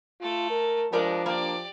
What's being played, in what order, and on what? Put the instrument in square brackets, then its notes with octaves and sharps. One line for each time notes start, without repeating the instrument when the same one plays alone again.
[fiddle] A3 A4 [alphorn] F4
[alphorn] A#4
[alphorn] F3 [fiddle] G#3 D4 [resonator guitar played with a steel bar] G4 A#4 D5
[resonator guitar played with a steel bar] A#3 D4 [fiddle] G4 D5